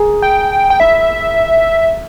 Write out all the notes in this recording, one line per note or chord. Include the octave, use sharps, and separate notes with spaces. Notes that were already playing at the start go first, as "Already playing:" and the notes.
Already playing: G#4 A#4
G5
G5
E4 E5